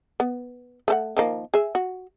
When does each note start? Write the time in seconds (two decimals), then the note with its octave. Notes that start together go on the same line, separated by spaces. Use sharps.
0.20 B3
0.88 A3 A4 F#5
1.17 D#3 F3 A#3
1.54 G#4 E5
1.75 F#4